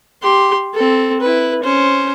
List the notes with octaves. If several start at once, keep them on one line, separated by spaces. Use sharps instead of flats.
G4 C6
C4 A4
E4 B4
C#4 C5